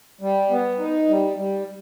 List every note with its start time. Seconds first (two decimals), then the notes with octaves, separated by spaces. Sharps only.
0.21 G3
0.50 B3
0.79 D#4
1.09 G3
1.37 G3